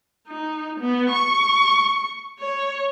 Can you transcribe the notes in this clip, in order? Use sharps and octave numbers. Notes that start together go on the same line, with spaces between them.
D#4
B3
C#6
C#5